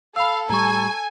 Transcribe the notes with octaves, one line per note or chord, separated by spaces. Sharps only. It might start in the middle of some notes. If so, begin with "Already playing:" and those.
A4 F5 B5 E6
A2 G3 G#5 A#5 C#6